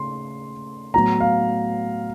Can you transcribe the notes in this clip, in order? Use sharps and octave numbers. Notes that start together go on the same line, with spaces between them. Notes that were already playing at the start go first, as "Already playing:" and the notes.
Already playing: C#3 A3 C6
A2 F#3 B3 A#5
F5